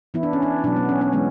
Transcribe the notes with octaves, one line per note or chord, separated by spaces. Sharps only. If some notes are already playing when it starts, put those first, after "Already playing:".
E3 B3 E4
D4
C#4
D4
B2 F#3 B3 D4
B3
C#4
C#4
E3 G#3 B3 C#4